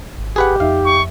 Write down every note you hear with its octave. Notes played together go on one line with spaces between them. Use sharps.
G#1
G4 G#4 B4 F#5
F2 D#4 E5 F5
C#6